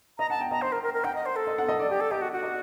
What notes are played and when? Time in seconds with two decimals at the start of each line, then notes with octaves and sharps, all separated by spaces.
0.19 D#5 A#5
0.30 F#5 A5
0.40 G5
0.51 D#5 A#5
0.62 C5
0.72 A#4
0.83 A#4
0.94 A#4
1.04 F#5 G5
1.15 D#5
1.26 C5
1.36 A4
1.47 D#5
1.58 F#5
1.68 D#5
1.79 D5
1.90 G4 D5
2.00 A4
2.11 G4 D#5
2.22 F#4
2.32 F#4
2.43 D#5